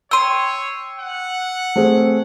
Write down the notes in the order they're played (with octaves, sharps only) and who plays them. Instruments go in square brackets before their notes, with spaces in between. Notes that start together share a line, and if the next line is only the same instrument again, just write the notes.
[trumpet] C#5 [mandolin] G5 C6 [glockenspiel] E6 D#7
[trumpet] F#5
[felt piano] A3 C4 G#4